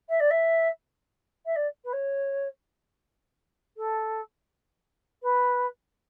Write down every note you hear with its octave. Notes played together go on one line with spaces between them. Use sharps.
E5
D5
E5
E5
D5
B4
C#5
A4
B4